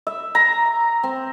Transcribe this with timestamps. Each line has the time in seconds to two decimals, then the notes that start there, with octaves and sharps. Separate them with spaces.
0.07 E5
0.35 A#5
1.03 C4